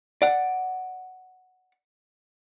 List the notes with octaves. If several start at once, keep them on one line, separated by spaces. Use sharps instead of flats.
D5 F#5